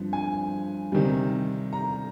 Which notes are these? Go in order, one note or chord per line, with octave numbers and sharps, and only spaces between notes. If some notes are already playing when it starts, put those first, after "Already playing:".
Already playing: G2 F3 C4
G#5
C3 D#3 G3
A#5